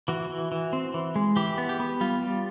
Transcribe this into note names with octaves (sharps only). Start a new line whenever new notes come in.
E3 F#4
E3
E3
C4
E3
G#3
E3 G4
B3
G4
B3
G3 F4
G3